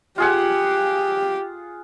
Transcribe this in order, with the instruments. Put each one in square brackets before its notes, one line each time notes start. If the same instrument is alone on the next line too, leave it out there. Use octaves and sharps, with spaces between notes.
[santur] F4 G#4 F#5 [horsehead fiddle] G4